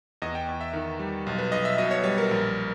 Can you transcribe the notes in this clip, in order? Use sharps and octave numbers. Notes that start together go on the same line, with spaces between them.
E2 D#5
G5
E2
E5
D#3
G3
B1
B4
B1 D#5
E5
B2 D#5
C#5
G3 C#5
A#4
A#1